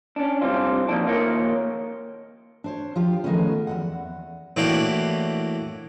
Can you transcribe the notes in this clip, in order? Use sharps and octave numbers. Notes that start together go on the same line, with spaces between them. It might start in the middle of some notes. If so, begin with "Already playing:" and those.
C#4 D4
G#2 C3 G3 C4 D4 F4
A#2 F3 D#4 D5 A5
D#2 A#2 D#3 F4 A#4 C#5
D4 C5 C#5
F3 F4 G4
D#3 F3 G#3 A3 B3 C#4
E2 G2 F#5
A2 E3 A#3 D4 F#4 G4